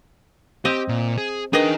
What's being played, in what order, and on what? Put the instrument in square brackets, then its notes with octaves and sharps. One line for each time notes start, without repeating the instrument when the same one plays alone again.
[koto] C4 D#5 [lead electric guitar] G4
[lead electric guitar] A#2
G#4
[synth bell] D4 A#4 B4 [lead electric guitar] D#4 G5 [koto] G#4 D#5